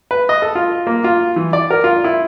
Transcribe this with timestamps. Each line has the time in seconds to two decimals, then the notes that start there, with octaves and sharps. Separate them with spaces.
0.11 B4
0.29 D#5
0.42 A4
0.55 F4
0.87 A#3
1.04 F4
1.36 E3
1.53 D5
1.71 A#4
1.84 F4
2.04 E4